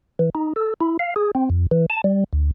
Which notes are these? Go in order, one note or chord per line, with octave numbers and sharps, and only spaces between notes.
E3
D#4
A4
E4
F5
G#4
C4
F2
E3
A5
G3
D2